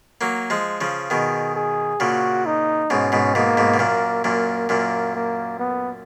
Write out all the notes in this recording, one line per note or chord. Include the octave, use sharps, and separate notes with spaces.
F#3 A#3
F3 G#3
C#3 F3
B2 D#3 G#4
G#4
A#2 C#3 F#4
D#4
G#2 B2 C#4
G#2 B2
G#2 B2 A#3
G#2 B2
B2
F#2 A#2 A#3
F#2 A#2 A#3
F#2 A#2 A#3
A#3
B3